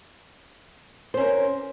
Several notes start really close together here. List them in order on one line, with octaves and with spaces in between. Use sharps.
C5 C#4 A#4